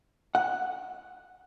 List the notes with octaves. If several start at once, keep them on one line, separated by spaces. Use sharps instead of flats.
F#5